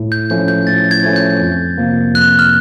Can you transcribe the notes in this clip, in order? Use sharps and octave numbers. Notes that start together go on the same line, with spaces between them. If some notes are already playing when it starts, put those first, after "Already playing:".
Already playing: A2
G6
F3 A3 C#4 G6
G6
A2 A6
G#6
F3 A3 C#4
G6
F2
C3 F3 A#3
F2 F#6
F6